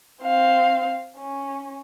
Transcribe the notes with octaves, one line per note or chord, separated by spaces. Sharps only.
C4 F5
C#4